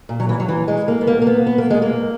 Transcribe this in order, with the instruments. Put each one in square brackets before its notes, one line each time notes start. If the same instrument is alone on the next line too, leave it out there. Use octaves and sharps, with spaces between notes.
[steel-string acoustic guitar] A#2
F#3
E3
F#3
E3
G#3
A#3
B3
A#3
A#3
B3
B3
A#3
G#3
A#3